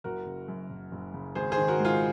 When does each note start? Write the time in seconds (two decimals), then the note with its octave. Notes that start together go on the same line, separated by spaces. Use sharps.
0.04 F#1 F#4 A#4
0.26 C#3
0.48 F#2
0.70 F#1
0.92 F#1
1.14 C#3
1.35 G#1 G#4 C5
1.52 G#4 C5
1.57 D#3
1.68 F#4 A#4
1.79 G#2
1.85 F4 G#4